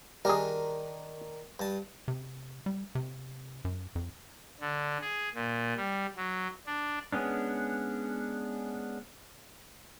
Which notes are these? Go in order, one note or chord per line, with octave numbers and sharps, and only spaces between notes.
D#3 G3 D4 G#4 A#4
G2 A5
C3
G3
C3
F#2
F2
D3
G#4
A#2
G3
F#3
D4
G#3 B3 C#4 D4